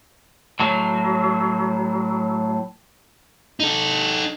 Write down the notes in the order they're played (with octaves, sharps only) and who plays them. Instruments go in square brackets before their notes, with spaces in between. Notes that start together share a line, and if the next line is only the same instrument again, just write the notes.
[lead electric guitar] A2 F#3
D#4 A4